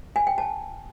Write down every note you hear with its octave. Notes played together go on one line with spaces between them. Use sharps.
G#5
G5
A5